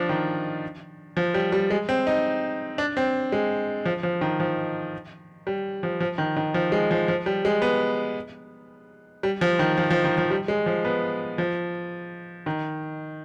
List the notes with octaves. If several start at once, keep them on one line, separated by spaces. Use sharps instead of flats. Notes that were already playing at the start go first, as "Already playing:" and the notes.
Already playing: F3 D4
D#3
F3
G3
G3
G#3
C4
D#4
D4
C4
G#3
F3
F3
D#3
F3
G3
F3
F3
D#3
D#3
F3
G#3
F3
F3
G3
G#3
B3
G3
F3
D#3
F3
F3
D#3
F3
G3
G#3
F3
B3
F3
D#3